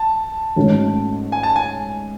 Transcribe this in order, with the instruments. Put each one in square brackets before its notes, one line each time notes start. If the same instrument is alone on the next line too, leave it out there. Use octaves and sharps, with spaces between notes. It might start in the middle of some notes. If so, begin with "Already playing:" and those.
Already playing: [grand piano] A5
[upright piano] G#2 F#3 A3 C#4
[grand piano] G#5
A5
G#5